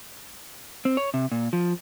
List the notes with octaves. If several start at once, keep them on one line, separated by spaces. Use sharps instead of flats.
C4
C#5
C3
A#2
F3